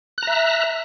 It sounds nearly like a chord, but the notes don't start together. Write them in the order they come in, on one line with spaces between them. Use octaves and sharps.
F#6 A#5 E5